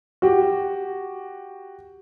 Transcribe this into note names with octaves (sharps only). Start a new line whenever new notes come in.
F#4 G4